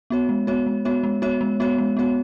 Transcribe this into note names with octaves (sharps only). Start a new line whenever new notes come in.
B3 F#4 C#5
G#3
B3 F#4 C#5
G#3
B3 F#4 C#5
G#3
B3 F#4 C#5
G#3
B3 F#4 C#5
G#3
B3 F#4 C#5